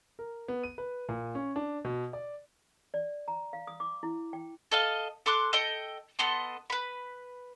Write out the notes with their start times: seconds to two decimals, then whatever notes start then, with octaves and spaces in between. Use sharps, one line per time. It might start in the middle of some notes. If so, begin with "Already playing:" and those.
0.19 A#4
0.48 B3
0.63 D#7
0.78 B4
1.09 A#2
1.35 C#4
1.56 D4
1.85 B2
2.13 D5
2.94 D5
3.28 A#5
3.53 F5
3.67 D#6
3.80 D6
4.03 E4
4.33 G5
4.72 A4 D#5 F5
5.26 A4 C6 D6 F#6
5.53 A4 D#5 G5
6.19 B3 A4 D#5 C6
6.70 B4 B5